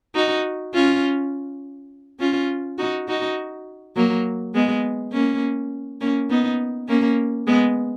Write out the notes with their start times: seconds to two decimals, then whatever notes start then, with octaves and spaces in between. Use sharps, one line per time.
0.15 D#4 F#4
0.74 C#4 F4
2.20 C#4 F4
2.78 D#4 F#4
3.08 D#4 F#4
3.96 F#3 A#3
4.54 G#3 B3
5.12 A#3 C#4
6.01 A#3 C#4
6.30 B3 D#4
6.88 A#3 C#4
7.47 G#3 B3